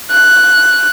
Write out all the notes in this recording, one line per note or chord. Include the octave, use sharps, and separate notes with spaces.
F#6